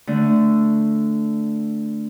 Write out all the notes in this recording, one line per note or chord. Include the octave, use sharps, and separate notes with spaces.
D3 A3